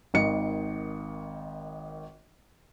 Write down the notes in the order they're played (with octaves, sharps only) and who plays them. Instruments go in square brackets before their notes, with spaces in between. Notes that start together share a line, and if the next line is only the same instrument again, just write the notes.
[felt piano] G#1 D#3 D#5 C#7